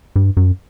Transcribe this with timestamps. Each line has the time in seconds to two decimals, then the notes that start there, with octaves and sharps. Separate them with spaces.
0.16 G2
0.37 F#2